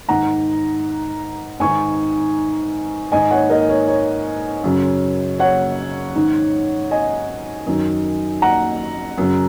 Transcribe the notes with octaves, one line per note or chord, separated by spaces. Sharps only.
G#2 D#3 F#5 A#5
G#2 D#3 G#5 C#6
G#2 D#3 D#5 G#5
C#5 F#5
A#4 D#5
C#5
C#5
F#2 C#3
C#5 F#5
G#2 D#3
D#5 G#5
F#2 D#3
F#5 A#5
F#2 C#3